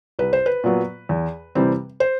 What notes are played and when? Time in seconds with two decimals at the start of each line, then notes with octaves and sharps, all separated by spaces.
0.19 C2 B4
0.33 C5
0.46 B4
0.64 A#2 F#3 B3
1.09 E2
1.55 C3 E3 G3 C4
2.00 C5